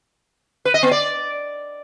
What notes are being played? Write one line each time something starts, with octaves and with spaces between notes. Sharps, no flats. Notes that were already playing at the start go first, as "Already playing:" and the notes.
B4
D#5
B3
D5